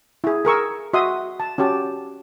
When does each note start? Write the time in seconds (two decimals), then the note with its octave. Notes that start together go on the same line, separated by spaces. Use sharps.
0.24 E4 G#4
0.45 G#4 A#4 C#6 E6
0.94 F#4 D#5 E5 C6 D#6
1.40 A5
1.58 C#4 F#4 G4 A5